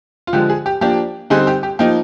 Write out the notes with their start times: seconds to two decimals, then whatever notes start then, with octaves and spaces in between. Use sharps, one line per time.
0.27 F4
0.33 D3 F3 G#3 G4
0.50 G#4
0.66 G4
0.81 F3 A#3 D4 G4
1.30 D3 G3 C4 D#4 G#4
1.47 G4
1.63 G4
1.79 F3 A#3 D#4 G4